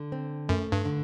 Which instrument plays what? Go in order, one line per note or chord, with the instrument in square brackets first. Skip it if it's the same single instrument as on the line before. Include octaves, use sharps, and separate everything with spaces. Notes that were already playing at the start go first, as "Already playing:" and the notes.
Already playing: [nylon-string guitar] D3
C4
[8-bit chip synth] F#2 [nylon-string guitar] A3
[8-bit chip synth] G2
[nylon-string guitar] D3